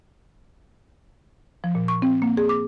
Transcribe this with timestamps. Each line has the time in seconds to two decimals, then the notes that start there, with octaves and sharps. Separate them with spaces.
1.64 F3
1.75 A#2
1.88 C#6
2.02 C4
2.22 A#3
2.37 G#4
2.49 D6